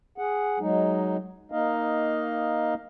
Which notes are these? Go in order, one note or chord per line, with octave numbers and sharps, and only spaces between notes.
G#4 F#5
F#3 G#3 D#4
A#3 D#4 D#5 F5